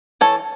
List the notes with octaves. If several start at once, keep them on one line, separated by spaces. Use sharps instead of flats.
E3 A4 C#5